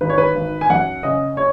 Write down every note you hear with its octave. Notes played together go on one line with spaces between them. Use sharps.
G#1 B4
C#5
B4
G#1
G#5
F#2 F#5
C#3 D#5
C#5